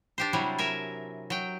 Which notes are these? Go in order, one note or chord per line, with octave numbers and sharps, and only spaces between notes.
D4 G4 C5
C3 F#3 G3 E4
A#4 E5 G#5
F#3 G5